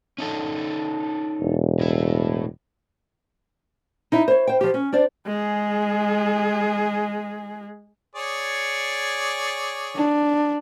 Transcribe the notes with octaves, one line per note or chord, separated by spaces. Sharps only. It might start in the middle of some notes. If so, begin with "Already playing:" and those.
C#4 D#4 A4
E1
A2 E4
D#4 E4 E5
C5 C#5
C5 G5
F3 G4
C#4
D4 C5 D5
G#3 G#4
G#4 C#5 D5
D4